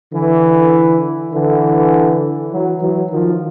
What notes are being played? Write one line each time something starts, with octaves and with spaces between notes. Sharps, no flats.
D3 E3
D3 E3
E3 F#3
E3 F#3
D#3 F3